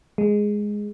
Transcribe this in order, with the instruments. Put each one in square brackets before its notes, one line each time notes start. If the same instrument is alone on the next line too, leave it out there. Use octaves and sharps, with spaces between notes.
[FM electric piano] G#3